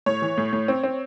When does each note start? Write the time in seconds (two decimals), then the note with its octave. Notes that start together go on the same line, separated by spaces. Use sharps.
0.06 A2 C#5
0.22 E3
0.38 A2
0.53 A2
0.68 C4
0.83 C4